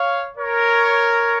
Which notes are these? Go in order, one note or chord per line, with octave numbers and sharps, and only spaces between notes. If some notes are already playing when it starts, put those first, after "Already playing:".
Already playing: C#5 F5
A#4 C#5